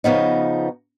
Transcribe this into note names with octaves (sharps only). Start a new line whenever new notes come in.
C#3 F3 B3 D#4